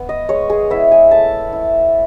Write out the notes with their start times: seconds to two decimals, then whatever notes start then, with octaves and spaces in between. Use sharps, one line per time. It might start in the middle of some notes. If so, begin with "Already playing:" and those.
Already playing: B3
0.09 D#5
0.29 G#3 C#5
0.50 G#4
0.70 B3 E4 E5
0.92 G#5
1.11 A3 A5
1.53 E4